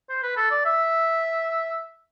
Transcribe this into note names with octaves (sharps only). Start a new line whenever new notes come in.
C5
B4
A4
D5
E5